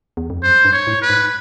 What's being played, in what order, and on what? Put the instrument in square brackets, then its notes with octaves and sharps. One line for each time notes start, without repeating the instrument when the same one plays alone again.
[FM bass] E2
F2
[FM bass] F#2 [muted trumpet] C5
[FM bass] G2
[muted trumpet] C#5
[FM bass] A2
[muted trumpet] B4
[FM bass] G#2